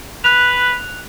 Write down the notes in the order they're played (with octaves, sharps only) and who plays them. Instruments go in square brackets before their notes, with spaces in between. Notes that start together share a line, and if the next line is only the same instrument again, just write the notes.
[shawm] B4 [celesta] F#6 F7